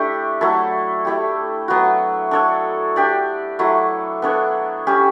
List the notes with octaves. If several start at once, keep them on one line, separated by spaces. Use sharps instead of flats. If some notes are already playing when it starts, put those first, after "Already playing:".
Already playing: A3 D4 E4 G4
F#3 A3 E4 A4
A3 E4 G4
F#3 B3 F#4
D4 A4 C#5
D4 G4 D5
F#3 A3 E4
B3 D4 A4 C#5
G3 C#4 G4